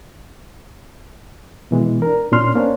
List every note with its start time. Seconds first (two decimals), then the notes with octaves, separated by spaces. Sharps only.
1.71 B2 E3 G#3
2.02 D4 A#4
2.32 A#2 C#4 D4 C6 F6
2.55 A#3 C#4 D4 C5